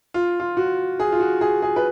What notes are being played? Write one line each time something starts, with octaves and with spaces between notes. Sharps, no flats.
F4
F4
F#4
G#4
F4
F#4
G#4
G#4
B4